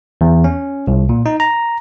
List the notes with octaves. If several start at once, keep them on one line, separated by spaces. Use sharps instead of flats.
E2
C#4
C2
A#2
D#4
A#5